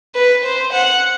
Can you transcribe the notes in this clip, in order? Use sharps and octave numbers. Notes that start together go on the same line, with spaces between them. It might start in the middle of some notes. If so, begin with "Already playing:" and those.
B4
C5
F#5